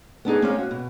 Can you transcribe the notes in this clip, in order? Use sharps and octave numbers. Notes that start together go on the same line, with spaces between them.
B3 D4 D#4 G#4
A#3 C4 C#4 C#5 D#5 F5
F#4
B2